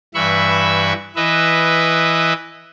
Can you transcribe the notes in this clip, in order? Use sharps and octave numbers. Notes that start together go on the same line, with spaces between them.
G2 E3 E5 B5 C#6
E3 B4 D#5 E5